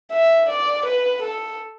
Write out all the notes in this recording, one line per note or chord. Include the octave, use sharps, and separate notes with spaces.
E5
D5
B4
A4